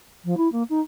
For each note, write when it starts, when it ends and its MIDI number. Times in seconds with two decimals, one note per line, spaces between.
0.25 0.37 53
0.37 0.50 64
0.52 0.63 58
0.70 0.80 63